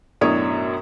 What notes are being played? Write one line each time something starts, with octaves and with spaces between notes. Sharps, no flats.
B1 F#2 A2 D4 C#5 D#6